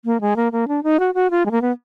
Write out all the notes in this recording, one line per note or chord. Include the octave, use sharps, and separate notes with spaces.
A#3
G#3
A#3
A#3
D4
D#4
F#4
F#4
F4
G#3
A#3
B3